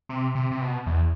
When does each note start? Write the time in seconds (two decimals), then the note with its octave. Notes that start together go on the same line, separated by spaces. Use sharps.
0.09 C3
0.35 C3
0.51 C3
0.61 B2
0.86 E2